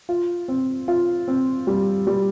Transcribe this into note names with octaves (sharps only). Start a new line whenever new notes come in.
F4
C4
F4
C4
G3
G3